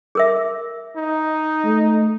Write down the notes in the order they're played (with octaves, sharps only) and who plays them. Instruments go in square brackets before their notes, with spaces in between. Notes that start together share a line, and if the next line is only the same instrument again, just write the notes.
[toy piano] G#4 A#4 E5
[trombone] D#4
[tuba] A3